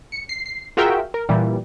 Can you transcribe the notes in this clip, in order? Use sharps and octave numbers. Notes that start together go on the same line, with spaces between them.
C#7
C7
C7
F4 F#4 G#4 A#4 E5 G5
A#4
A#2 E3 G3